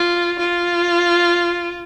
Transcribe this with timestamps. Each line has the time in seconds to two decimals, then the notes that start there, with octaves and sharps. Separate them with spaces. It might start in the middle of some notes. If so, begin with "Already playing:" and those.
Already playing: F4
0.39 F4